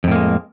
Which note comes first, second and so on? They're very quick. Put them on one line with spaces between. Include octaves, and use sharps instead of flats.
F2 A2 A#3 G#3